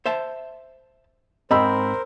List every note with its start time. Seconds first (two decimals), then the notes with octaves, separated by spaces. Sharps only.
0.06 C5 E5 A5
1.51 G#2 C4 A#4 C5 D#5 B5 E6